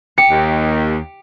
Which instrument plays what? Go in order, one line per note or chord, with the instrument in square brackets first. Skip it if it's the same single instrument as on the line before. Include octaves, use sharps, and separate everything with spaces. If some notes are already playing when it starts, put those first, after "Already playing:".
[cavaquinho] G4 [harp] C#7
[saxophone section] D#2